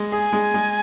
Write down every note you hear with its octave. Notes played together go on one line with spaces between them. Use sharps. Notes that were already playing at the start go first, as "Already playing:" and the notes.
Already playing: G#3
G#4 G#5
G#3
G#3